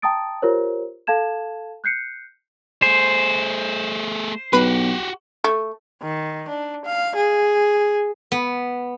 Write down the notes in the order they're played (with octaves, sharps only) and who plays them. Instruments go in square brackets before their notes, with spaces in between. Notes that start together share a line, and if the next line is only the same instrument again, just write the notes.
[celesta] G5 A5 A#5 D#6 A6 D7
F4 G4 A#4 C5 C#5
A4 F5 A5 G#6 E7
F#6 G6 C7 C#7
[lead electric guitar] A3 G#4 [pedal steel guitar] C5
[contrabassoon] B1 [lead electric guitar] F#4 G4 [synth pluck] B4 B5
[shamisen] A3
[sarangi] D#3
D4
F5
G#4
[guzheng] B3